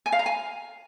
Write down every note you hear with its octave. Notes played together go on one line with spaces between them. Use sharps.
G#5
F5
A#5
G#5